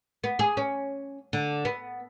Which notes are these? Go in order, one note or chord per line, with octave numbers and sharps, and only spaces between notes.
B3
G#4
C#4
D3
B3